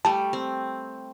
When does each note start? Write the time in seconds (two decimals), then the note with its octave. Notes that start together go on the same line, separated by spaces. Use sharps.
0.05 G3 A3 A5
0.33 C4